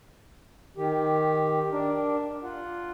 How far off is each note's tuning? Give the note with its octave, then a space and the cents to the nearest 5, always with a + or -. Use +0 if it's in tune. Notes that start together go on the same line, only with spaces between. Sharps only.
D#3 +0 G4 +0
D4 +0 A#4 +0
F4 +0 F#5 +0